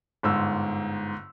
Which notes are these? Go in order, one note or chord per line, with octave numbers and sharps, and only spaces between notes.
G1 G#2 E6